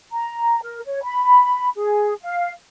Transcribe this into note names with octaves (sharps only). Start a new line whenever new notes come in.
A#5
A#4
C#5
B5
G#4
F5